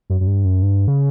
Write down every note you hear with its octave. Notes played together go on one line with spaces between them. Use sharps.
F#2
F#2
G2
F#2
G2
C#3